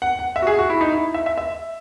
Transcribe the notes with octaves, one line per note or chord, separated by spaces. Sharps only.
F#5
F#5
E5
F#4
G#4
F#4
E4
D#4
E4
E5
E5
E5